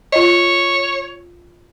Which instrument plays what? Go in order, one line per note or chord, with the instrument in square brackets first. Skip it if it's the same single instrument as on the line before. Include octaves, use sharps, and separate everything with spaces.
[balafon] F4 D#5 [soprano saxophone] C#5